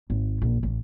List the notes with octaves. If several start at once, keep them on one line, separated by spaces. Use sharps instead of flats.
G#1
A#1
A1